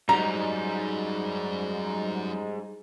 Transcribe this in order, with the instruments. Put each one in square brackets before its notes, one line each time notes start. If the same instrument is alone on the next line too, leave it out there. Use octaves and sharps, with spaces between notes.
[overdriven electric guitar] G#2 [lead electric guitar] F#3 C#4 [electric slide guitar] G3 D#4 [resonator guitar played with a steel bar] A#5